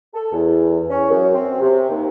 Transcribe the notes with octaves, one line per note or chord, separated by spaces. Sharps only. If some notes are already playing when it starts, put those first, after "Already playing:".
A4
E2
C#4
F#2
C4
C3
D#2